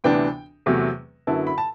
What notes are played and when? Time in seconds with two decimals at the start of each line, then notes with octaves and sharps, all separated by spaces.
0.04 D2 C3 E3 B3 D4 G5
0.66 E2 C3 F#3 A3
1.27 F#2 D3 F#3 B3 E4 A5
1.47 B5
1.58 A5